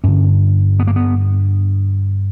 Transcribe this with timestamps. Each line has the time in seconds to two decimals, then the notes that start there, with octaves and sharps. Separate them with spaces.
0.04 G2 D3 C#4
0.79 B3
0.87 A#3
0.96 B3